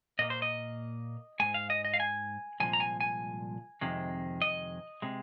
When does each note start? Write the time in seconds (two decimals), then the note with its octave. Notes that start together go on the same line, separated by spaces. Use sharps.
0.19 A#2 A#3 D#5
0.30 C5
0.42 D#5
1.40 G#2 G#3 G#5
1.54 F5
1.70 D#5
1.85 D#5
1.94 F5
2.00 G#5
2.60 C2 A#2 F3 G#3 G#5
2.73 A#5
2.80 G#5
3.00 G#5
3.81 F2 C3 D#3 G#3
4.42 D#5
5.02 C3 G#3